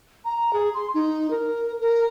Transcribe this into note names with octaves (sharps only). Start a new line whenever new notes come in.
A#5
G#4
C6
D#4
A#4
A#4